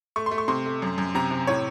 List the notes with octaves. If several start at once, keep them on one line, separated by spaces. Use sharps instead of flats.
A3 C#6
C6
A3
C#6
C3 C6
A3
F#2
F#2
C3 A#5
C3
A2 C#5